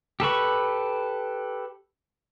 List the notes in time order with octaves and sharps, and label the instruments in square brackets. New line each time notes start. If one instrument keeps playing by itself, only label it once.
[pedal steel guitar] G4 A4 B4 C#6